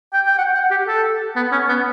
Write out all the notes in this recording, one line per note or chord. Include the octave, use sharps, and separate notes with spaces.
G5
G5
F#5
F#5
G4
A4
B3
C#4
B3